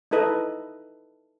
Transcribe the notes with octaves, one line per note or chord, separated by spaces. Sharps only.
D#4 E4 A4 B4 D#5